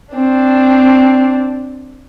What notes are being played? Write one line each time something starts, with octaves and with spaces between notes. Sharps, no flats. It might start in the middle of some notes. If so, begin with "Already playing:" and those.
C4 D4